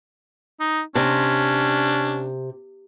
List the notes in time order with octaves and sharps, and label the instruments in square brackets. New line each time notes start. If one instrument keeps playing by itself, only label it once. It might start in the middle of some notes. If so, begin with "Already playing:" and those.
[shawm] D#4
[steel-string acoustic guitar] C3 [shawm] C#4 [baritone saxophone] D4